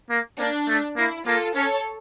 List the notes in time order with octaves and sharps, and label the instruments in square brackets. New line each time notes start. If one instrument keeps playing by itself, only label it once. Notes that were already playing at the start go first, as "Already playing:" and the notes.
[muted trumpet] A#3
[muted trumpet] A#3 [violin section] D4
[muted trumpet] A3
[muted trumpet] A#3 [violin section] E4
[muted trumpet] A#3 [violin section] F4 A4
[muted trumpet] C#4 [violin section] A4 C#5